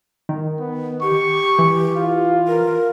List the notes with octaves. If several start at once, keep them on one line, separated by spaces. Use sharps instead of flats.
D#3
B3
G4 C#6
E3
F4
A#4